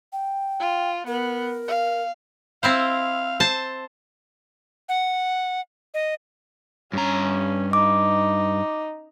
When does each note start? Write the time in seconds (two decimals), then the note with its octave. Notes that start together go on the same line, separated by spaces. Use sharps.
0.12 G5
0.60 F4
1.07 B3 A#4
1.68 F5
2.63 C4 E4 C5 F5
3.40 C5 A5
4.89 F#5
5.94 D#5
6.93 G2 C#4 A#5
7.73 D#4 D6